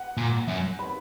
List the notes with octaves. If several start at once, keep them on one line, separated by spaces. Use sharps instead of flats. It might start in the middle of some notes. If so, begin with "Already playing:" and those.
Already playing: F#5
A#2
F#2
B5